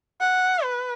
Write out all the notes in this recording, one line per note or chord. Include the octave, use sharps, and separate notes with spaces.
F#5
B4